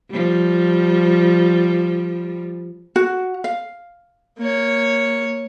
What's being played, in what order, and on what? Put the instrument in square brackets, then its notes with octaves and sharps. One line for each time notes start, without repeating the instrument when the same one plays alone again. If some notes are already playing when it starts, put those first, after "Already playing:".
[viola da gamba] F3 G3
[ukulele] F#4
F5
[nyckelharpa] A#3 C#5